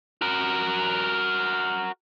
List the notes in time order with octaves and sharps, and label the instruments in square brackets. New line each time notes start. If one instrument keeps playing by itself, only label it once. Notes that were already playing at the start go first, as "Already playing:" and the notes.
[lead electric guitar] F#4 A#4